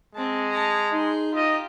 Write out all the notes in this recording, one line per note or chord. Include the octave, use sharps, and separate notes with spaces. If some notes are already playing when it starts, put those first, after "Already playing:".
G#3 C4 A5
A5 A#5
D#4 G#4 C6
F4 G4 D#5